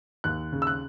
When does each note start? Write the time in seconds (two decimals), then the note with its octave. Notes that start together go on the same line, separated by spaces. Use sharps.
0.24 D#2 F#6
0.53 C#3
0.62 E6
0.67 F#6